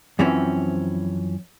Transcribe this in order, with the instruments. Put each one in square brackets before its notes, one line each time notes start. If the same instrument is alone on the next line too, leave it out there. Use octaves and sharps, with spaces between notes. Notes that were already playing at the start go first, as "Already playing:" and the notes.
[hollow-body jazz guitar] F#2 E3 F3 C4 C#4